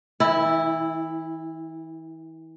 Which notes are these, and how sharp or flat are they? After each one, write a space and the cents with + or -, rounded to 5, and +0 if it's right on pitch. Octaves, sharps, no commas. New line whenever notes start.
E3 -35 E4 +0